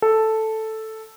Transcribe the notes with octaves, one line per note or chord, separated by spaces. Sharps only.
A4